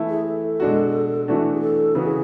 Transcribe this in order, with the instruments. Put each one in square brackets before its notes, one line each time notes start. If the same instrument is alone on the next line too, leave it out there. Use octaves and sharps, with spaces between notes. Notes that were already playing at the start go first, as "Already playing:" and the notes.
Already playing: [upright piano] E3 A3 E4
[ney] G#4
A4
[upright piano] B2 G#3 D4 F#4
E3 A3 D4 F#4
[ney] G#4
A4
[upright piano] C#3 E3 B3 F#4 [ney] G#4